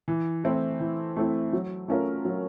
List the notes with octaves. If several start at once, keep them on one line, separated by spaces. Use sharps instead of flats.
E3
A3 C4 E4
E3
A3 C4 E4
F#3
A3 C#4 F4 A#4
F#3